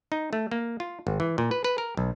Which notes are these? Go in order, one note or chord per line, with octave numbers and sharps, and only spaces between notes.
D#4
A3
A#3
F4
G#1
E3
A#2
B4
B4
A#4
B1